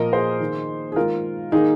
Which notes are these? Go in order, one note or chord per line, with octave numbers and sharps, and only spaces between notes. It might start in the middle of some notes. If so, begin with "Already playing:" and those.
Already playing: A#2 F3 A#3 A#4 D#5
G#4 C5
D#3 A#3
G#4
D#3 G#3 F4 A#4
D#3 A#3 D#4 G#4